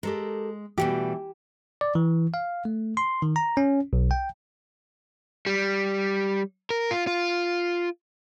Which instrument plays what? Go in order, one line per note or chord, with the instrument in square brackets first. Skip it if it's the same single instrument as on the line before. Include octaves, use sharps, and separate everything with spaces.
[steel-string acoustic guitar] G#3 [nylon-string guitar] G4 A4 A#4
[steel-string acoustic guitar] B2 G3 A3 [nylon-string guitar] E3 [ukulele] G4
[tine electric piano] D5
E3
F5
A3
C6
D#3
A#5
C#4
B1
G5
[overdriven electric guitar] G3
A#4
F4
F4